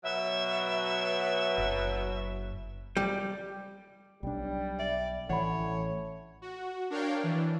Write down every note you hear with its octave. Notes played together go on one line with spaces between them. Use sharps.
B2 F#3 E5
F#1
G3
B1 G3 D4
D5 E5
A1 E3 A3 C#5 F#5 B5
F#4
D4 A#4 C#5 F5 G5
E3 D4